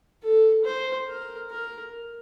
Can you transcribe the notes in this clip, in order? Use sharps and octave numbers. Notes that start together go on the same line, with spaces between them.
A4
C5
A#4
A#4